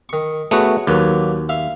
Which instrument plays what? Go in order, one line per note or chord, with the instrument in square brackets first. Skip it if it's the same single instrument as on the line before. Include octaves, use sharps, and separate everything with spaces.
[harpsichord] D#3 C#6
[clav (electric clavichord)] A3 B3 F#4 [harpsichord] G#4 C#5
[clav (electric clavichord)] D#2 [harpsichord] F#3 A#3 B4
[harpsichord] E5 F5